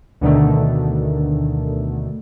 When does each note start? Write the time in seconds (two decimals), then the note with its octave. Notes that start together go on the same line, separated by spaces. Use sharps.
0.21 D2 B2 D3 D#3 A3